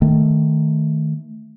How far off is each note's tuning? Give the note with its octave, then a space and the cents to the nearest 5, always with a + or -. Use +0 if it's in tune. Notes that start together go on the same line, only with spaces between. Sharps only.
D#3 +0 A3 +0